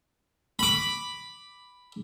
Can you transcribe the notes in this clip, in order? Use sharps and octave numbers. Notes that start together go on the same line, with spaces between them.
B5 D6